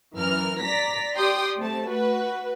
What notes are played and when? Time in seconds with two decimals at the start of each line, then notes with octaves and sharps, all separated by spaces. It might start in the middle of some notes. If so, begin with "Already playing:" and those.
0.18 F#2 E3 A#4 F6
0.62 D5 A#5 A#6 B6
1.16 G4 D5 G5 C6 D#6
1.59 A3 C4 A5
1.89 F#4 B4